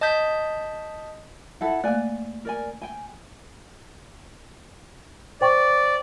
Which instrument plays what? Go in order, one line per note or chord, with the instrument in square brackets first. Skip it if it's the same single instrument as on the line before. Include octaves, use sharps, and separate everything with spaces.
[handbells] D#5 A5 D#6 G6 B6
[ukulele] E4 A4 F#5
[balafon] A3 A#3 [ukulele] D5 G#5
[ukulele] A#4 D5 G#5
G5 G#5
[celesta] C5 G5 C#6 [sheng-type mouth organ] D5